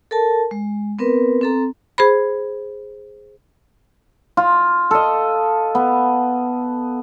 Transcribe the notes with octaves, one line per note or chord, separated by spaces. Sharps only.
A4 A#4 A5
G#3
B3 C4 A#4 B4
C4 A4 A#5
G#4 C5 B5
F4
A4 D#5
B3